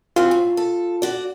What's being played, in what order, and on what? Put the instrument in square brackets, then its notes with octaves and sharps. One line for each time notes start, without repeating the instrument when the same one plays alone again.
[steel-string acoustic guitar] E3 C4 F#4 [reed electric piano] F4
[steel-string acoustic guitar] A2
A4
F#4 D5